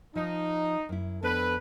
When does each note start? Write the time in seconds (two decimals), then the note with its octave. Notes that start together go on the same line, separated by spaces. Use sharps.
0.16 F3 D#4
0.89 F#2 E4
1.23 F2 B3 D4 A4 B4